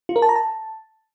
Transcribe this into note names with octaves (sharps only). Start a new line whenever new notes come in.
F4
A#4
A5
A#5
A5